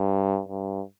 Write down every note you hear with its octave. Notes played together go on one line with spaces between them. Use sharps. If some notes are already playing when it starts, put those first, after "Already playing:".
Already playing: G2
G2